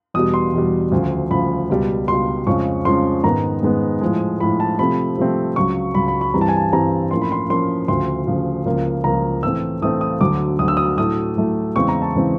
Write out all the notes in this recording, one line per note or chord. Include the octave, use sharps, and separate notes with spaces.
E2 B2 G3 D#6
C6
E2 B2 G3
D2 C#3 F3
D2 C#3 F3 B5
C#2 B2 G3
C#2 B2 G3 C6
F2 C#3 F3 G#3 C#4 C#6
F2 C#3 F3 G#3 C#4 C6
G#2 D#3 G#3 B3 A#5
G#2 D#3 G#3 B3
A2 F3 G#3
A2 F3 G#3 B5
A5
C3 F3 A3 C4 B5
C3 F3 A3 C4
C#2 C#3 F#3 C#6
C#2 C#3 F#3 B5
B5
B5
G2 E3 G3 C4 A#5
A5
G#5
A5
G2 E3 G3 C4 A#5
A2 F3 A#3 C#4 C6
B5
C6
A2 F3 A#3 C#4 C6
D2 C#3 F3 C6
D2 C#3 F3
C#2 C#3 F3 A#3
C#2 C#3 F3 A#3 A#5
A2 E3 A3 C4 E6
A2 E3 A3 C4 D#6
D#6
D2 D3 F#3 D6
D2 D3 F#3 D#6
E6
D#6
A2 F#3 A3 D#6
A2 F#3 A3
E2 C#3 E3 G#3 C4 C#6
A#5
A5
C#3 E3 G#3 C4